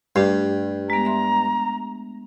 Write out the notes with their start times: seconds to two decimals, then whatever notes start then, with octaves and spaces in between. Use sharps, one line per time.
0.16 G2 A3 D4 G4
0.90 G#3 B3 A#5
1.05 E5 C6